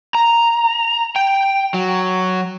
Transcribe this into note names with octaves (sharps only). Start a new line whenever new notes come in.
A#5
G5
F#3